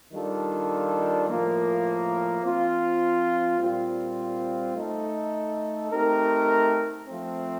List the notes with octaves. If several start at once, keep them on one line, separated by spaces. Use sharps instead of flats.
D#3 G3 D4 F4 A4
A2 F3 A#3
F3 C4 F4
A#2 G3 C4 F4
A3 D#4 A4
A3 C4 D#4 G4 A#4
F3 A3 C4